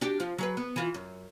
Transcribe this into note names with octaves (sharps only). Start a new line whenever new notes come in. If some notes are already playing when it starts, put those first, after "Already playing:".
D4 F#4 G4
F3 F4
F#3 G#4 B4
B3
E3 F4
F#2